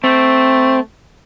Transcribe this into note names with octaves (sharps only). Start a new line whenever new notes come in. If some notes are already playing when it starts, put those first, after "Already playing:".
A3 C4